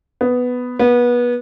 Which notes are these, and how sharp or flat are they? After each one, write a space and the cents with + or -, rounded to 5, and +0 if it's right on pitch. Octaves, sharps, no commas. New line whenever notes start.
B3 +5
B3 -25